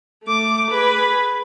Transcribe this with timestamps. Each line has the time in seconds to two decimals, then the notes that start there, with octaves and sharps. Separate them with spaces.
0.23 A3 D6
0.71 G#4 B4